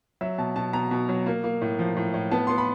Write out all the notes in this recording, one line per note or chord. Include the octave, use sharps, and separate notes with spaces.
F#3 E5
B2 A5
B2 A5
B2 A#5
B2
F#3
A#3
A#3
A2
F3
A2
A2
B3 A5
B3 C6
B5